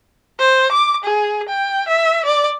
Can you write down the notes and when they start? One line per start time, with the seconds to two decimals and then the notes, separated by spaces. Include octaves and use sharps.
0.39 C5
0.72 D6
1.04 G#4
1.49 G5
1.88 E5
2.25 D5